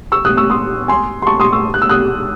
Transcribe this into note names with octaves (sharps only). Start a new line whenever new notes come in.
C#6 E6
D#6 F#6
C#6 E6
C6 D#6
G#5 C6
C6
A5 C#6
C6 D#6
C#6 E6
F#6
E6
D#6 F#6